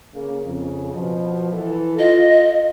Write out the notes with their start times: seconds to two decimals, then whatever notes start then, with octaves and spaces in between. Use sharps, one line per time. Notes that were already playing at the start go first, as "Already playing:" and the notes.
0.14 C#3 A#3
0.45 F2 C#3
0.92 B2 F3
1.52 E3 A4
1.98 F4 D#5